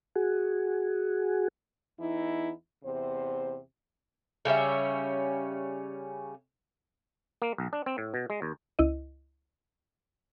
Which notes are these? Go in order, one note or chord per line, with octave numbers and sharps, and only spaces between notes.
F#4 G#4
E2 E3 D#4 E4
E2 C3 C5
C#3 G3 C#4 E5
A#3
B1
D4
C4
A2
B2
G#3
D#2
C#2 E4 D#5